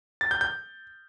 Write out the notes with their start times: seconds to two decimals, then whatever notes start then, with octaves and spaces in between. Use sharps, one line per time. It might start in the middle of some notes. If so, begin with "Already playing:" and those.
0.21 A6
0.31 G6
0.41 G6